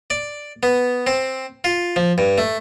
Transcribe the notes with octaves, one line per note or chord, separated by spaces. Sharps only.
D5
B3
C4
F4
F3
G2
A3